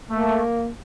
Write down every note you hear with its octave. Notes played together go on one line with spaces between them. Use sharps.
A3 A#3